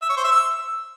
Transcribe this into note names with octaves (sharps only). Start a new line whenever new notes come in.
E5
C#5
C5
E5
E6